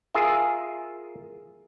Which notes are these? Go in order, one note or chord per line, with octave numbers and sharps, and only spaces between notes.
F4 G#4 A#4 E5